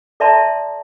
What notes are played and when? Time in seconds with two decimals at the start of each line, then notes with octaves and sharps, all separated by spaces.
0.20 A4 D5 E5 A5 A#5 C6